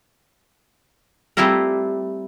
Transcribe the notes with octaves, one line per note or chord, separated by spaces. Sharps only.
G3 A3 C4 E4 F4 A#4